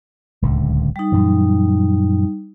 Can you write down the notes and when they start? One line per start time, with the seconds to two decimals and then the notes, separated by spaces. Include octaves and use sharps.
0.42 D1 C#2 D3
0.96 G3 D#4
1.12 F#2 A#2 E3